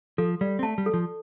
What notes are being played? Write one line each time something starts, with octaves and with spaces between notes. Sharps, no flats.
F3 A4
G3 D5
C4
A3 A5
G3
A4
F3